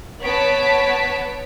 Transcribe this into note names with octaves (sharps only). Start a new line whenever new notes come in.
B3 C#5 A5 B6 D7